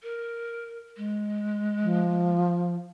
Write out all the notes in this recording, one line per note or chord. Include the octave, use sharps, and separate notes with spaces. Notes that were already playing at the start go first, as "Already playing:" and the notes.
A#4
G#3
F3